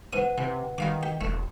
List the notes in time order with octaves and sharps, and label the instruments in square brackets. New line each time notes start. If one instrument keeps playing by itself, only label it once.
[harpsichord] G#2 D#6 [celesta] B4 F#5
[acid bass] C3 [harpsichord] E3
[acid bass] D#3 [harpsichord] G3 F5 D6
[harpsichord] G4
[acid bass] E1 [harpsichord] A3